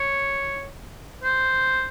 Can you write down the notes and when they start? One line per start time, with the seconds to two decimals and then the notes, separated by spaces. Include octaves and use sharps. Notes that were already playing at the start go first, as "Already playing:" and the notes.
Already playing: C#5
1.24 C5